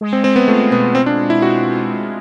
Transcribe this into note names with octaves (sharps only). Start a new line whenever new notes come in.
G#3
C4
G#3 C4
B3
A3 F4
B2 B3
G#3 C4
D4
G#3
E4
C4 F#4
F4
G#3